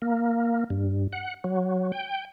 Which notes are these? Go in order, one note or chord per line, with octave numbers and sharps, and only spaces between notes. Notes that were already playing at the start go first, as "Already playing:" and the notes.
A#3
G2
F#5
F#3
G5